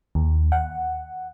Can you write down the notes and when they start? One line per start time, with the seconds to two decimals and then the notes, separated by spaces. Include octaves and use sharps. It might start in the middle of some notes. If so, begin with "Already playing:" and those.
0.15 D#2
0.52 F#5